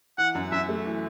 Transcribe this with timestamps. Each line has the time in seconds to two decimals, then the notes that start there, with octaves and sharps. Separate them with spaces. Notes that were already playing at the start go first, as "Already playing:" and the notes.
0.18 E3 F#5
0.35 F#2
0.52 F#2 E5
0.69 A3
0.85 E3